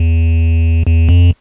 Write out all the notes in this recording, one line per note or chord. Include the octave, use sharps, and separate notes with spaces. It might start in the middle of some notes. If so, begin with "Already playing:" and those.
Already playing: E2
E2
F2